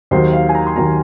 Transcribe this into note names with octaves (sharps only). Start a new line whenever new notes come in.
D#2 D#3 F#3 C5
F5
G#5
A#5
C6
D#2 D#3 F#3 A#5